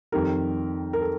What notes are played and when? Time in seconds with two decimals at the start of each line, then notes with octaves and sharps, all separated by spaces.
0.12 F2 D#3 G3 A#4
0.93 A#4
1.01 A4